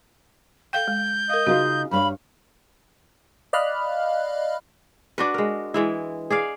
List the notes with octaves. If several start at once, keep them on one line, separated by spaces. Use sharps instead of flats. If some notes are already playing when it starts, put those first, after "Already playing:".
A4 F5 G5 G6
G#3
A#4 D#5 F5
C#3 D#4 F4 F#4
G2 C#5 F5 B5
D5 D#5 F5 B5 F6 F#6
D4 F#4 B4
G#3 A#4
E3 G#3 E4
G#4 D5 F5